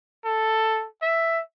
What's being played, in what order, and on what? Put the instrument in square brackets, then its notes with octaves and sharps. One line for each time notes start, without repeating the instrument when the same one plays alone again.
[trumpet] A4
E5